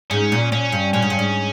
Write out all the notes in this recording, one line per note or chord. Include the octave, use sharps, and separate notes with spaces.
G#2 C#4
A#2
A#2 C#4
G2
A#2 C#4
G#2
G2
G#2